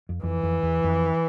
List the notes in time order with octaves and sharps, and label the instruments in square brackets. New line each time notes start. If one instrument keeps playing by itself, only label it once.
[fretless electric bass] F2
[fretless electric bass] F2 [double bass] E3
[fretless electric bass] F2
E2
F2